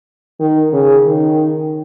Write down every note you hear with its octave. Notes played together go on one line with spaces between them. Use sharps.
D#3
C#3
D#3